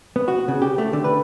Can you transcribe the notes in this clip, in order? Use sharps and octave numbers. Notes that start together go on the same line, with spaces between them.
B3
F#4
C#3
G4
A3
D3
B4